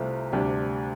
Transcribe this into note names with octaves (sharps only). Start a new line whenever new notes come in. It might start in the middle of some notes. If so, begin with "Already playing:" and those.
Already playing: C2 C3 A3 C4 F4
D2 C3 G3 D4 G4